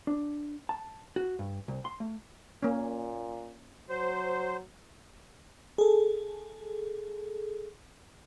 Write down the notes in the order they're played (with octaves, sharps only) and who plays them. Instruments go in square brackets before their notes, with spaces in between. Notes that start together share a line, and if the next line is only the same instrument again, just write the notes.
[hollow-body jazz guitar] D4
A5
F#4
G2
C2
C6
A3
[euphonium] A#2 [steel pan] A#3 C#4
[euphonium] F#3 [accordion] C5
[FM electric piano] G#4 A4